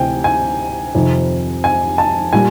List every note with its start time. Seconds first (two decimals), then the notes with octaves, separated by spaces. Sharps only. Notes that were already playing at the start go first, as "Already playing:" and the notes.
Already playing: D2 C3 E3 G5 G#5
0.24 G#5
0.95 F2 C3 D#3
1.64 G#5
1.98 A5
2.33 A#2 G3 G#5